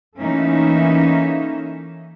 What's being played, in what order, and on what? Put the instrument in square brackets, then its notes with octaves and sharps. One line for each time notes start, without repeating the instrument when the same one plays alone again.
[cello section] E3 A3 A#3 C#4 D#4 E5